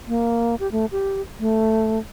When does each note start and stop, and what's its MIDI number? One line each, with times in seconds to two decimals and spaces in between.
0.08 0.55 58
0.60 0.70 67
0.72 0.86 57
0.92 1.21 67
1.40 1.99 57